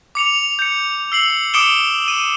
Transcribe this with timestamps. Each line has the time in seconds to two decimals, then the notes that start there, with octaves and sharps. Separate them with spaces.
0.15 D6 C#7 F7
0.59 G6 C#7
1.12 E6 C7 F#7
1.54 D6 D#6 C#7 D7 E7 G7
2.08 D#7